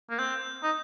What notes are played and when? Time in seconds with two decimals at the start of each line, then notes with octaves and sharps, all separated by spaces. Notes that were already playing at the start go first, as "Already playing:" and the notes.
0.10 A#3
0.19 C4 G6
0.63 D#4